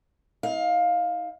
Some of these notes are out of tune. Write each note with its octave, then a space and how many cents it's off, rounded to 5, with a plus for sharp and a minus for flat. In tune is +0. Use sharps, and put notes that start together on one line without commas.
D#4 +45 F5 +15